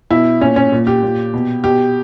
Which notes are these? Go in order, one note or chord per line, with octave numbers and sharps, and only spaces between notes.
B2 E4
A#2 C#4
C#4
A#2
G4
A#2
B2
B2 G4